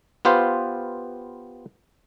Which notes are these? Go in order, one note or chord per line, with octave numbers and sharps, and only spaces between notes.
B3 F4 G4 B4 C5 F5